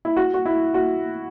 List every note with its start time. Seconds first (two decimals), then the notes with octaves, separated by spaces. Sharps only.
0.05 E4
0.17 F#4
0.34 F#4
0.45 E4
0.74 F#4